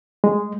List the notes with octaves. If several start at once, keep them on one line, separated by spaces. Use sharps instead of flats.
G#3